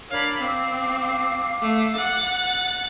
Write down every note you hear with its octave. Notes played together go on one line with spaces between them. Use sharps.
D4 A#4 C#5 F5 B5
C4 F5 D6
A3
F#5 A6